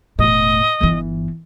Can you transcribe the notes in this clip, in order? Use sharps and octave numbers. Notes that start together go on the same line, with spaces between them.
E1 A2 D#5
G1 E3